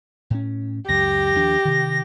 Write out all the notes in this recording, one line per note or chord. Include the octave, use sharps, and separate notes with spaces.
A2 C#4
C#2 F#2 G4 A#6
D#2 F3 D4
C3 D#3